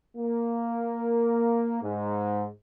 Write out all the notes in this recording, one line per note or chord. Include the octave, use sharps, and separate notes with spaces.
A#3
G#2